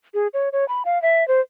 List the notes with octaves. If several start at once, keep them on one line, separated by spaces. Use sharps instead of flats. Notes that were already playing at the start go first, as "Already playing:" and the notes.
G#4
C#5
C#5
B5
F5
E5
C5